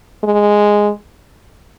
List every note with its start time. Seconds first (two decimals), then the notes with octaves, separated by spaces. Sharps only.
0.24 G#3